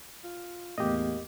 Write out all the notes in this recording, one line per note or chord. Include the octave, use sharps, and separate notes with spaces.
F4
E2 A2 A#3 G4 D#5